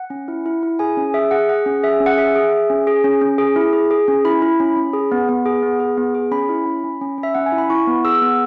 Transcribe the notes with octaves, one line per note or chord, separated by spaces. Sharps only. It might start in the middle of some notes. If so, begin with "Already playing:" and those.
Already playing: F#5
C#4
E4
E4
E4
G#4 G#5
C#4
G#4 E5
G#4 F#5
G#4 F#5
C#4
G#4 E5
C#4
F#5
G#4 E5
G#4
G#4
C#4
G#4
C#4
C#4
G#4
E4
G#4
G#4
C#4
E4 B5
E4
C#4
C#4
G#4
B3
B3
G#4
B3
G#4
B3
G#4
C#4 B5
E4
C#4
C#4
C#4
C#4
E5
C#4 F#5
G#5
E4
B5
E4 C#6
B3
G#4 E6
B3